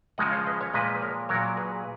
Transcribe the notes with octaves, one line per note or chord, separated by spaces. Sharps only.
C#3 F3 G#3 D#5 F#5
C#5 F5
B4 D#5
C#5 F5
A#2 F3 G#3 B4 D#5
B4
A#4 C#5
A#2 F#3 A#4 C#5
G#4 B4